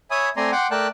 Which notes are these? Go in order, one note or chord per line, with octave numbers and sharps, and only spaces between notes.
C#5 E5 G#5 B5 D#6
A3 C4 D5 G#5 A#5 C6
F#5 G5 C6 D6
A3 A#4 D5 G5 A5 F#6